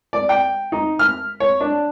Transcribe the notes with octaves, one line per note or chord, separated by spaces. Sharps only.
D5
G5
D#4
F6
C#5
D4